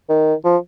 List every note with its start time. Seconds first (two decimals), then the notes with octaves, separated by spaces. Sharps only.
0.09 D#3
0.44 F3